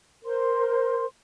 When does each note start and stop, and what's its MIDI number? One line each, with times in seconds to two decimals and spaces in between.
0.25 1.05 70
0.25 1.05 72
0.25 1.05 84